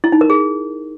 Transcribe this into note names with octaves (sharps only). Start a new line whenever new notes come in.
E4
D#4
A#4
G#4